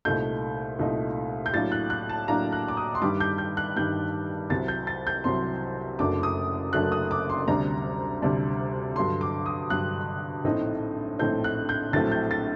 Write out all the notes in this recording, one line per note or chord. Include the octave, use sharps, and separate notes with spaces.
C2 A#2 A3 D#4 G6
C2 A#2 A3 D#4
G6
A2 F#3 A#3 D4 A6
F#6
F#6
A5
A2 F#3 A#3 D4 A#5
F#6
D6
D#6
C6
G2 D#3 G3 D4 D6
G6
G6
F#6
G2 D#3 G3 D4 G6
C2 C3 F#3 A6
G6
A6
G6
C2 C3 F#3 C6
F#1 F#2 F#3 A3 D4 D6
D#6
F#1 F#2 F#3 A3 D4 F#6
D#6
D6
C6
D2 C3 G3 D4 A#5
D2 C3 G3 D4
G2 D3 F#3 C6
D6
D#6
G2 D3 F#3 F#6
A#1 A2 A3 C4 D#4
A#1 A2 A3 C4 D#4 G6
F#6
G6
A#1 A2 F#3 A3 C4 A6
G6
A6